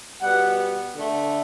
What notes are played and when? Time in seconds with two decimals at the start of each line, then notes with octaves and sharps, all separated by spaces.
0.22 B2 G3 B3 F#5
0.96 D3 A3